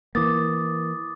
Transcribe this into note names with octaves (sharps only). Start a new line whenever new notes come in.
E3 A#3 D6 D#6 A6